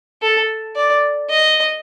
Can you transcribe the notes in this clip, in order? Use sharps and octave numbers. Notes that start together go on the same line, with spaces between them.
A4
D5
D#5